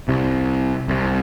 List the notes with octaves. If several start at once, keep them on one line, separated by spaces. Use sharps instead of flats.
C2 C3
C2 C3